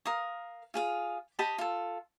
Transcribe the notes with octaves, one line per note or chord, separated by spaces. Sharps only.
A#4 F5 D#6
F4 G#4 F5
G4 D#5 A5 B5
F4 A4